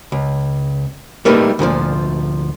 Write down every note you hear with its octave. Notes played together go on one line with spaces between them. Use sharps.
C#2
G3 A3 A#3 D#4 G4 B4
D2 A#2 E3 F3